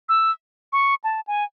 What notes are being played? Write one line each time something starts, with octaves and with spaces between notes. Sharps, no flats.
E6
C#6
A5
G#5